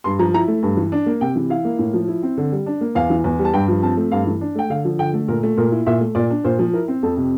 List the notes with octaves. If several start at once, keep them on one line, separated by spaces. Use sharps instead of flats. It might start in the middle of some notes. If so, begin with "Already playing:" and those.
G2 C6
F3 A#5
E4 A#5
A3
G2
E3
D4
A#3
C3 G5
E3
E4 F5
A#3
A2
F3
E4
C4
D3
G3
D4
A#3
E2 F5
E3
E2
G3
A5
G2 G5
F3
C4 A5
A3
G2 F5
E3
D4
A3 G5
D3 F5
F3
D3 G5
A3
A#2 A#4
A3
A#2 A#4
E4
A#2 E5
A3
A#2 D5
D4
A#2 C5
F3
E4 A#4
C4
F2 A4
C3